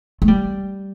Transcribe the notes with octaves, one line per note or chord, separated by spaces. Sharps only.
A3
G3